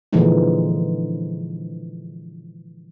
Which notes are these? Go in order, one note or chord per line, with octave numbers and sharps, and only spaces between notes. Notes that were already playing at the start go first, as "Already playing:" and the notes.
A#2 D3 E3 F3 G#3 D#4